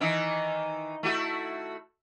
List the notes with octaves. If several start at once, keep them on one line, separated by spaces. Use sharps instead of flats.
D#3 E3 D#4
A3 E4 F#4